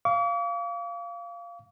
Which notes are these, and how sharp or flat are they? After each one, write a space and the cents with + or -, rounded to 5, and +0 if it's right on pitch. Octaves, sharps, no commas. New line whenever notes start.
F5 -10 D6 -45